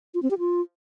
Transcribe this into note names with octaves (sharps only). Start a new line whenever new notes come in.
F4
C4
G4
F4